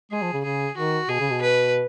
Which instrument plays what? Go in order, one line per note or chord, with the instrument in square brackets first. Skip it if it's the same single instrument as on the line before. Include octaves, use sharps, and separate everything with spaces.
[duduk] G#3 [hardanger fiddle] G#4
[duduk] F3
C#3
[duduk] C#3 [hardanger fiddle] G#4
[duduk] D#3 [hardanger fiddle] F#4
[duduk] B2 [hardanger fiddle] G#4
[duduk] C#3
B2
[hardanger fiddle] B4